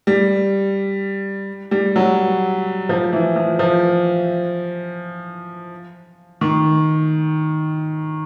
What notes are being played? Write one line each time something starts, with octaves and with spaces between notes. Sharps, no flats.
G3
G3
F#3
F3
E3
F3
F3
D#3